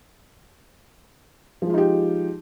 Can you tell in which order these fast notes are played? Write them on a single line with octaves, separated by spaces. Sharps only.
F3 G#3 F4 D#4 G4